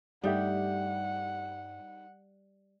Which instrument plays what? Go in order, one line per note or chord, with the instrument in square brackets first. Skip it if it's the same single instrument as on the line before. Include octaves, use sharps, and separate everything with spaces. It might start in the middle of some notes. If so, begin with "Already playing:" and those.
[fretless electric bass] G2 A3 [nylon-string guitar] G3 [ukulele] D#4 G4 E5 [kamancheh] F#5